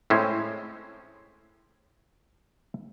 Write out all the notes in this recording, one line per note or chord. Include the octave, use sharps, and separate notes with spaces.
A2 G#3 C4 C#4 E4 C5